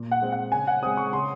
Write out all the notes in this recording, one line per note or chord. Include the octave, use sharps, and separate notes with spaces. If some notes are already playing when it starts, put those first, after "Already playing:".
Already playing: A#2
F#5
G#3 C4
F#5
C#3 G#5
F#5
G#3 C4 D#6
C#6
C#3 C6